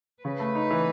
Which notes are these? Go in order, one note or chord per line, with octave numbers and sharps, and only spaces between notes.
C#3 B4
A3
D#4
E3